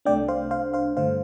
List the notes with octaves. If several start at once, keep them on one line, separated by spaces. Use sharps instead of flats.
C2 C3 A3 D4 D5 G5
C5 F5
C5 F5
C5 F5
G2 D3 A3 C5 F5